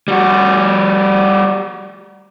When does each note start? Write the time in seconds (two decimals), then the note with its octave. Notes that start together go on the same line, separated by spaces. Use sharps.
0.08 G3 F#4